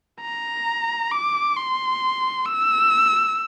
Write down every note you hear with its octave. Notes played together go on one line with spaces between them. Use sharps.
A#5
D6
C6
E6